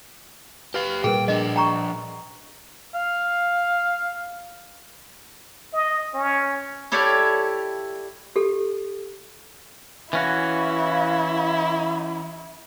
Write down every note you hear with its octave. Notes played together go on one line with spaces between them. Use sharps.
G4 B4 F5
A#2 G3 G#4 A#4 B4 G5
F3 D4 D#5
G5 A#5 C#6
F5
D#5
C#4
E4 G4 A4 C#5 D5 F5
G4 A4
E3 C#4 E4 F#4 F5